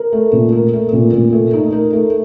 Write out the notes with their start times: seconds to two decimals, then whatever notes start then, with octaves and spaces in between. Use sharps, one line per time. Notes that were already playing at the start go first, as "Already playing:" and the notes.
Already playing: A#4
0.12 A3
0.33 A#2
0.52 A#4
0.73 A3
0.93 A#2
1.13 A#2
1.33 A3
1.53 D#4
1.72 A#4
1.93 A3